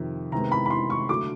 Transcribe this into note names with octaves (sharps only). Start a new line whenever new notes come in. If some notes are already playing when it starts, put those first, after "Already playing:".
Already playing: F2 C3 D#3
C3 D#3 G#3 B3 A#5
B5
B5
C6
C#6
D3 F#3 A3 D6